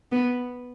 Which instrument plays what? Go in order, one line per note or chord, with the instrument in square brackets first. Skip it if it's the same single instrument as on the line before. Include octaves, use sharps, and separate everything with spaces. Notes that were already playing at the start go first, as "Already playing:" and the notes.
[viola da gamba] B3